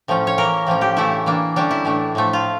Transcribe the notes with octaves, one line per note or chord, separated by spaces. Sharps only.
A2 F3 C#4
C#5
E3 A#3 C#4 A#4
A2 F3 A#3 C#4
G4
C#3 E3 A3 E4
E3 A#3 D4
D3 G3 C#4 D4
E4
A2 E3 A3 D4
A2 F3 A3
F4